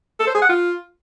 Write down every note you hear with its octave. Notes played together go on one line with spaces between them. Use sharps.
A4
C5
G#4
F#5
F4